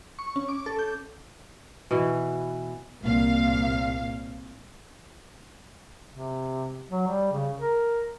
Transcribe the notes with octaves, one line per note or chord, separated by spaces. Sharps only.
C#6
C#4
D6
A4
G6
B2 E3
C2 A#2 F5
C3
F#3
G3
C#3
A#4